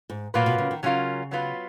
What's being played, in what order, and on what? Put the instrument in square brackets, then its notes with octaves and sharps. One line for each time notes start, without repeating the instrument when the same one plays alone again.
[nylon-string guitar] G#2
[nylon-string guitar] A#2 [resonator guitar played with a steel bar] F#3 A#3 F4 B4
[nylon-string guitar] B2
C#3
D#3
[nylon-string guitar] C#3 [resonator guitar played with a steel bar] F#3 C#4 F4 A#4
[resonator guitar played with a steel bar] F#3 B3 F4 B4